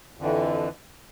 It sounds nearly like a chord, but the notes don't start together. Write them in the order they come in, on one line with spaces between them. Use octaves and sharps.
F2 D3 E3